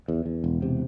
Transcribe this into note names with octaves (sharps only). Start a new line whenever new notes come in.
E2
E2
E1
C3